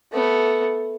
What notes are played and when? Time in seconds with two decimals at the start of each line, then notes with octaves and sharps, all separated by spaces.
0.13 A3 B3